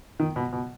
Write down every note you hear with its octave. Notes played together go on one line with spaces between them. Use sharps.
D#3
B2
B2